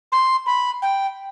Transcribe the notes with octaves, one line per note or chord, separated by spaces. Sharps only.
C6
B5
G5